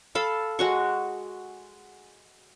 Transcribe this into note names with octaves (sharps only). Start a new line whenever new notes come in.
A4 F5 B5
G#3 F#4 C#6